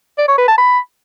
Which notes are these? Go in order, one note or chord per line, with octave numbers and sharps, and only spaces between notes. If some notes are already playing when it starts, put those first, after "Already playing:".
D5
C#5
B4
A5
B5